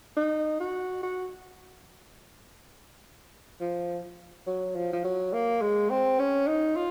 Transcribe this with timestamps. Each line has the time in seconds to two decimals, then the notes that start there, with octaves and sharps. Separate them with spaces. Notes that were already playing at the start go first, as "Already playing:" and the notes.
0.17 D#4
0.60 F#4
1.03 F#4
3.61 F3
4.47 F#3
4.75 F3
4.93 F3
5.04 F#3
5.33 A#3
5.61 G#3
5.90 C4
6.19 C#4
6.47 D#4
6.76 F4